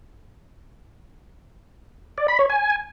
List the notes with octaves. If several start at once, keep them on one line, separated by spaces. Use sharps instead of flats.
D5
B5
C#5
G#5